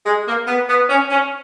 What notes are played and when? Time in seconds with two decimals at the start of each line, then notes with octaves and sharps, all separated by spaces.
0.04 G#3
0.26 A#3
0.47 B3
0.67 B3
0.89 C#4
1.10 C#4